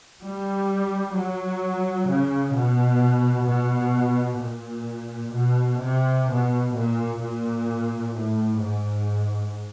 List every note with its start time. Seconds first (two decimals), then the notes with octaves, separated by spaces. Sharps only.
0.21 G3
1.14 F#3
2.08 C#3
2.54 B2
3.46 B2
4.41 A#2
5.34 B2
5.81 C3
6.27 B2
6.75 A#2
7.21 A#2
8.15 A2
8.61 G#2